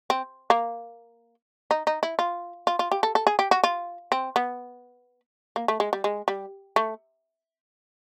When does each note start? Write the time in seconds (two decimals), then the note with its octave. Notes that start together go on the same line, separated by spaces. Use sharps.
0.10 C4
0.50 A#3
1.71 D#4
1.87 D#4
2.03 E4
2.19 F4
2.67 F4
2.79 F4
2.92 G4
3.03 A4
3.15 A4
3.27 G#4
3.39 G4
3.51 F#4
3.64 F4
4.12 C4
4.36 B3
5.56 A#3
5.68 A3
5.80 G#3
5.93 G3
6.04 G#3
6.28 G3
6.76 A3